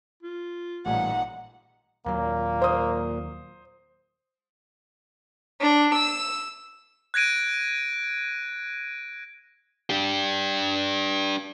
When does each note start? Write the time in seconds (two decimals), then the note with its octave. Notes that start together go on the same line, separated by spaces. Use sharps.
0.23 F4
0.86 A1 A#2 G3 D#4 F#5 G#5
2.06 D#2 A#2 F#3 A#3
2.62 C5 D#6
5.60 D4
5.93 E6
7.14 F#6 G#6 A#6 D7 D#7
9.90 D4 G4